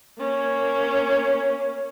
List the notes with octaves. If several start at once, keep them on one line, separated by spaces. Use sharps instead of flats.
A#3 C#4